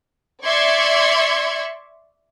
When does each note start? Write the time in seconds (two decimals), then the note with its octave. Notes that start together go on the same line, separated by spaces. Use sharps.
0.43 D5 E5 C6 C#6 G#6 C#7